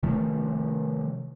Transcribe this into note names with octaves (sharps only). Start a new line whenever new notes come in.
C3 D#3 F3 A3